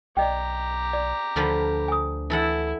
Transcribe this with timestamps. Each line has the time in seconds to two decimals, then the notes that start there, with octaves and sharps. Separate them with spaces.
0.17 B1 G4 D5 D#5 G5 A#5
0.93 D5
1.36 D2 D3 F3 B4
1.88 G#5 D#6
2.30 E3 E4 A4 F#5